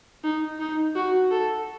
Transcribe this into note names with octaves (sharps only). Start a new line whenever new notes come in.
D#4
D#4
F#4
A4